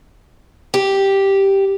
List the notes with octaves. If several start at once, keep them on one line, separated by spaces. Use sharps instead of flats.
G4